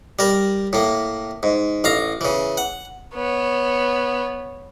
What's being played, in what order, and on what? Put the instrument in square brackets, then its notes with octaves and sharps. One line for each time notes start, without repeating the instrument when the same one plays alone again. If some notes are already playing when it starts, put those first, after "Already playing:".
[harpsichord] G3 A#4
A2 A#3
G#2
A1 F5 A#5
C#3 E3
F#5
[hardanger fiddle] B3 C#5